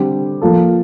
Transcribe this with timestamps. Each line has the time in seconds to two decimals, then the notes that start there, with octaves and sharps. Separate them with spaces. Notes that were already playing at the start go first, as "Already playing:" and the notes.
Already playing: D3 G3 C4 G4
0.42 F3 A#3 F4 A4